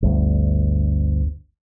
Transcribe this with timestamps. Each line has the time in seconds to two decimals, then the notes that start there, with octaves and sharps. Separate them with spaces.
0.02 G1 D2